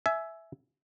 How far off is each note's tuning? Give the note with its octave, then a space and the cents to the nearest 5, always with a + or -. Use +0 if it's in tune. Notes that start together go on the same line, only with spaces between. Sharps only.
E5 +0 G#5 +20